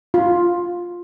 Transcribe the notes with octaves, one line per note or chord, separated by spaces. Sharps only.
F4